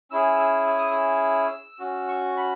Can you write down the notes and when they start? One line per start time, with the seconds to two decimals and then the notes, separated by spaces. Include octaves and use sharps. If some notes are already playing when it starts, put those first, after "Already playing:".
0.11 C#4 E4 G#4 E6
0.39 E6
0.67 E6
0.78 D#6
0.90 E6
1.80 C#4 F#4 E6
2.08 C#6
2.37 B5